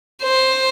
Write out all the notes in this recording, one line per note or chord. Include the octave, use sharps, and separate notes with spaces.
C5